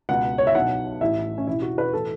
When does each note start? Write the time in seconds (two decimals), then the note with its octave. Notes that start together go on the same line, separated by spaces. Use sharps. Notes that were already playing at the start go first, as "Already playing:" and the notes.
0.09 C#2 B2 F#5
0.38 C#5
0.47 E5
0.55 B1 B2 F#5
1.01 A1 A2 E3 E5
1.38 C#4
1.47 E1 E2 E3 E4
1.62 F#4
1.78 B4
1.93 A2 E3 A4